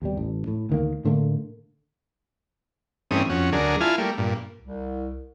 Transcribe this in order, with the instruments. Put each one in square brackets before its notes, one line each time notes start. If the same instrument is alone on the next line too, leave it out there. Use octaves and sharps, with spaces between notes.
[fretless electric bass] D#2 B2 G3
A1
A2
D2 D#3 A#3
A2 D3 A3 A#3
[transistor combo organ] G2 E3 A3 C4 C#4 D#6
F2 C#4 F#4
D2 F#3 D4 G#4 A#4
E4 F4 G#5 A5 F6
G3 A3 A#3
G2 A#2
[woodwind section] C2